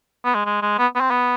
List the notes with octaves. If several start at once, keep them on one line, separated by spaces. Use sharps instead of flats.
B3
G#3
G#3
G#3
B3
B3
C4
B3